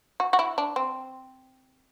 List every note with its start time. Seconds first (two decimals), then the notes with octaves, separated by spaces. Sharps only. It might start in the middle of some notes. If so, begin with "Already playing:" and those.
0.20 F#4
0.33 F#4
0.39 E4
0.58 D4
0.76 C4